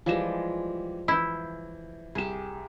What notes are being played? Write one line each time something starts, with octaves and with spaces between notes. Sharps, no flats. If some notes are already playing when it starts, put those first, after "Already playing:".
E3 F3 G3 G#3 G4 E7
E3 E4 G6
C2 G4 G#4 E7